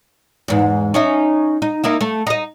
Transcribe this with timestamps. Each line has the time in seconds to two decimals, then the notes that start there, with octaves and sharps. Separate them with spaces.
0.48 E2 G#2
0.94 C#4 D#4 E5
1.62 D#4
1.84 A#3 D#4 E4
2.01 A3
2.27 D#4 D#5